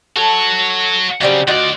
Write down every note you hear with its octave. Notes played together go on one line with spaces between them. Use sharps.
F#4 A4 C#5
C#3 F#3 G3 C4
D2 F4 F#4 D5 D#5